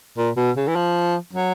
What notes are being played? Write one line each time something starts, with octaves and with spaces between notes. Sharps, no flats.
A#2
B2
C#3
E3
F3
F#3